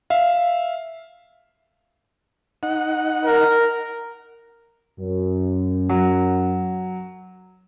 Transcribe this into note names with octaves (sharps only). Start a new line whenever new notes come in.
E5 F5
D#4 F#5
A#4
F#2
F#3